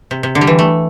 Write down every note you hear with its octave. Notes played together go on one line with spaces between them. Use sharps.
C3
C3
D3
G3
E3
A3